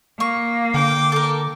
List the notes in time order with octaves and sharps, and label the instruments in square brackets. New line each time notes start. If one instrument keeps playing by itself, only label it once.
[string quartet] A#3 [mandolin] C#6
[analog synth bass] D3 [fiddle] G5 D6
[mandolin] A4 A#4